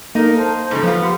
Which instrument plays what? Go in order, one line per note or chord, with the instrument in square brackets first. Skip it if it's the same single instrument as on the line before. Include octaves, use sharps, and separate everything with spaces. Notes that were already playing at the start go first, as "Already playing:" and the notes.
[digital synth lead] A#3 [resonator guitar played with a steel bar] D#4 [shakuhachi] A4 [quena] A#4
[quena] C5 [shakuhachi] A5
[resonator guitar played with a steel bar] G#2 C#3 F3 [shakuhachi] A4
[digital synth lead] F3 [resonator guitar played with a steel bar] B3 F4 [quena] F5
[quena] G4 [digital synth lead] F#5 [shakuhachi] C6